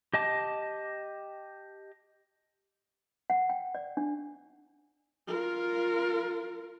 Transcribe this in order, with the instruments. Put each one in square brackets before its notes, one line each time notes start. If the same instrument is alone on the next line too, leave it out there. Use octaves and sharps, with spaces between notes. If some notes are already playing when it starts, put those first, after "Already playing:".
[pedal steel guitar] G4 D#5 A5 D6
[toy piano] F#5
G5
D5
D4
[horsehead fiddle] F4 A#4